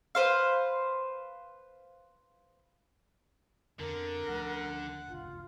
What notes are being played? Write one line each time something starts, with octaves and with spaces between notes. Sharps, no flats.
B4 C5 F5
F2 D3 B3 A#4
D2 F3 A3 F#5
G1 C#2 F4